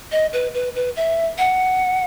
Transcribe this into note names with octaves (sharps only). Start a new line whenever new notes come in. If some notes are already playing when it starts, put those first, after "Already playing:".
D#5
B4
B4
B4
E5
F#5